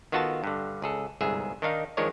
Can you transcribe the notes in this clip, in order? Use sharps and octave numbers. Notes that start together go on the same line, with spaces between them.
D#3 B3 F4 F#4 A4 A5
G2 D3
C#2 G#4 A4
G1 C2 G#2 G#4 E5
D#3 D4 D#4 F5
D#3 F3 G#3 D4 A#4 C#5